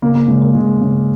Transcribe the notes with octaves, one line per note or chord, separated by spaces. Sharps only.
C#3 A#3
A#3
C#3 G#3
A#3
C#3 G#3
C#3